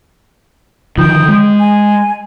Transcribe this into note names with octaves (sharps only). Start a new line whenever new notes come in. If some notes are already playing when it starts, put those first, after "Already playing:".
D3 D#3 F3 G5 D#6 G6
G#3
G#5